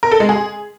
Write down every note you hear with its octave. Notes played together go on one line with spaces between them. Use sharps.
A#4
A4
G#3
G#4